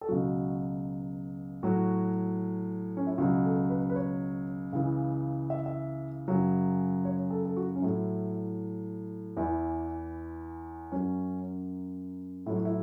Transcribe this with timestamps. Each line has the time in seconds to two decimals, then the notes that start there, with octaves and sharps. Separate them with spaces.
0.01 A4
0.08 C#2 B2 F#3 F#4
1.63 A2 F#3 F#4
2.97 C#4
3.07 E4
3.18 C#2 B2 F#3 F#4
3.44 A4
3.70 B4
3.90 B4
3.96 C#5
4.73 C#2 C#3 E3
5.50 E5
5.66 E5
6.28 F#2 C#3 F#3
7.05 C#5
7.30 A4
7.46 A4
7.57 F#4
7.76 C#4
7.82 A2 F#3 E4
9.37 E2 E3 E4
10.92 F#2 F#3 C#4
12.46 A2 F#3 E4
12.56 F#4
12.65 E4